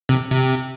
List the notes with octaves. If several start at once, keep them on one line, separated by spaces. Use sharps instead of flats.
C3
C3